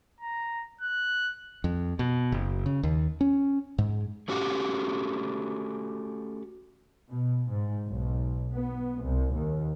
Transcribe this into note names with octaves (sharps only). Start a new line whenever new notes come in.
A#5
F#6
F2
B2
F#1
C#3
D#2
C#4
G#2
A3 C#4 F#4 G4 F5 F#5
B2
G#2
B1
B3
C2
D#2